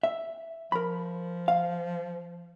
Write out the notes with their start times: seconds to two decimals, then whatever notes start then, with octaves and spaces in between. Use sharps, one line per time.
0.03 E5
0.72 F3 A#4 B5
1.48 F5